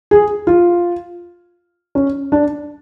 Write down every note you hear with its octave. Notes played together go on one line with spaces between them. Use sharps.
G#4
F4
C#4
D4